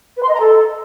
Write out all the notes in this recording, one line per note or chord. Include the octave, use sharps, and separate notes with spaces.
B4
C6
D#5
A#5
A4